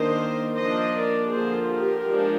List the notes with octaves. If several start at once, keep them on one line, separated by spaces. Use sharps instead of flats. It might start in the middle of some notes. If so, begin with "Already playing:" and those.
Already playing: D#3 A#3 D4 C5 D#5
F3 A#3 D4 C5 D#5
A#4 D5
D3 F3 A#3 G#4 C5
G4 A#4
F3 G#3 D4